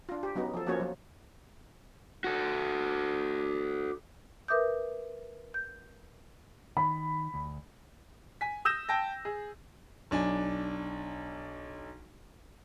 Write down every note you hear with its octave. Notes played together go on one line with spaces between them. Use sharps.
D4 F4
G4
F#3 B3 C#4 D#4
F3 A4
F3 A#3 C#4 F#4 C#5
F#3
F#4 A4
A#4 B4 E5 D6 D#6 G6
G6
D#3 B5
D2
G#5 B6
D#6 E6 G6 A#6 E7
G5 A5 A#6
G#4
B1 D4 G#5